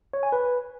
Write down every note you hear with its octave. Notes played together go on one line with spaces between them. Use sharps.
C#5
G#5
B4